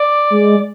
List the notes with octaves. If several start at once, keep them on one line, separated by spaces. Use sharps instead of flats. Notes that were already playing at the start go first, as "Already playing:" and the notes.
Already playing: D5
G#3